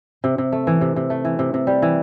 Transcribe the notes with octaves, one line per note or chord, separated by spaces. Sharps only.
C3
C3
A3
E3
C3
C3
A3
E3
C3
C3
G3
E3